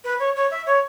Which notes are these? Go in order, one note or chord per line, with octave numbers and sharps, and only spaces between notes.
B4
C#5
C#5
E5
C#5